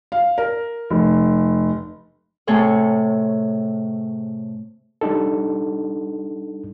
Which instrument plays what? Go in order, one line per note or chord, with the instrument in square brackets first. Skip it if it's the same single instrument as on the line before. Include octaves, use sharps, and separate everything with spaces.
[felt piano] F5
A#4
F1
[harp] A2 C3 G#4 A4 C#5
[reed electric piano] G3 D4 D#4 A4